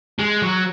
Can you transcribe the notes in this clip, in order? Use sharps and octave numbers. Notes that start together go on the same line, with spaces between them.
G#3
F#3